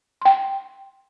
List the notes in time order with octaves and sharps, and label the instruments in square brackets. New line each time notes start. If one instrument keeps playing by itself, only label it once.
[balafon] G5 C6